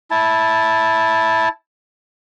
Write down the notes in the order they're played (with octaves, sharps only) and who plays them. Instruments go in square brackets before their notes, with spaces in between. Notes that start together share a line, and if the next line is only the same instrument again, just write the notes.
[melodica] E4 A5